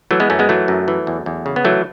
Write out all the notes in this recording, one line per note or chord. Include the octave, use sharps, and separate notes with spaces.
E3 F#3 A3
G#3 B3
F#2 A3 C#4
G#3 B3
E3 F#3 A3
F#2
E3
E2
E2
C#3
B3
E3 F#3 A3